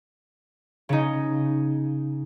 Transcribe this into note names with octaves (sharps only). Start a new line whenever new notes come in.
C#3 C#4 D#4